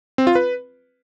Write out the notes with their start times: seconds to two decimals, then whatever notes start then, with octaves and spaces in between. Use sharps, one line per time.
0.18 C4
0.27 F4
0.35 B4